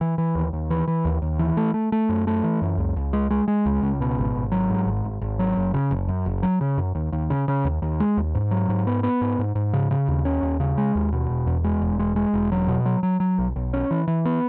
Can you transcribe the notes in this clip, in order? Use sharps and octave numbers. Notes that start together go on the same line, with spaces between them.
E3
E3
D#2
D#2
E3
E3
D#2
D#2
E3
A3
A3
A3
F#2
A3
E3
F#2
C#2
C#2
G#3
G#3
G#3
C#2
C#2
B2
G#1
G#1
F#3
G#2
G#1
G#1
G#1
F#3
F#1
C#3
F#1
F#2
F#1
F#3
C#3
F#2
D#2
D#2
C#3
C#3
D#2
D#2
G#3
D#2
G#2
F#3
G#2
B3
B3
G#2
G#2
G#2
C#3
C#3
D#2
C#4
D#2
C#3
G#3
D#2
B2
E1
E2
G#3
E1
G#3
G#3
E1
F#3
B2
F#3
F#3
F#3
B1
B1
C#4
E3
E3
B3